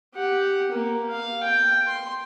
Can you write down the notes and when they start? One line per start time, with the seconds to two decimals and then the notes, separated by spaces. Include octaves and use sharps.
0.15 G4 F#5
0.72 A#3
1.10 F5
1.43 G5
1.87 C6